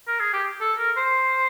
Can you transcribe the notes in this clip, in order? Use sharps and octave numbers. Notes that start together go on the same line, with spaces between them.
A#4
G#4
G4
A4
A#4
C5